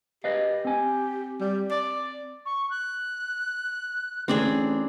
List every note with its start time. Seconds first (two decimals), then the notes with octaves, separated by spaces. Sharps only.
0.24 G4 B4 D#5 F5
0.65 C4 G#5
1.40 G3
1.71 D5
2.46 C#6
2.70 F#6
4.28 A1 C4 D4 G#4